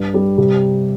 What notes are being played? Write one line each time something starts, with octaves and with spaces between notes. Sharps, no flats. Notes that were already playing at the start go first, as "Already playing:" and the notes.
Already playing: G2
G3
C3